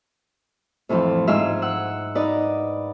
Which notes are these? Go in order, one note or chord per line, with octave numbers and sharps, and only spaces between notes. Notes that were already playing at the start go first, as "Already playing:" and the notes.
F2 A2 E3 F3
G#2 F3 G#3 F4 E5 F6
F#5 E6 F#6
D#4 B4 D5 D#5